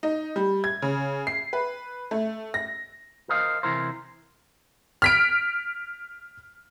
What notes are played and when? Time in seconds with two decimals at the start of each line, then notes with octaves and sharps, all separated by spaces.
0.03 D#4
0.36 G3
0.64 G#6
0.82 C#3
1.27 C7
1.53 B4
2.11 A3
2.54 A#6
3.29 A#4 C5 D#5 F5
3.63 C3 E3 E4 A#4 C5
5.02 F6 B6 D7